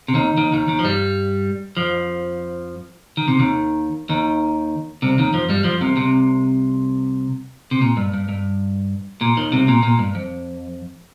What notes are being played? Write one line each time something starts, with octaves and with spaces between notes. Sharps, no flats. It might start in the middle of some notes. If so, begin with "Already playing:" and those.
C3
D#2 D#3
D#2 D#3
D#2 D#3
D#2 D#3
F3
G2 G3
F2 F3
D#3
C3
D#2 D#3
D#2 D#3
C2 C3
D#2 D#3
F2 F3
G2 G3
F2 F3
C2 C3
C2 C3
C3
A#2
G2
G2
G2
A#2
D#2 D#3
C2 C3
A#2
A#2
G2
F2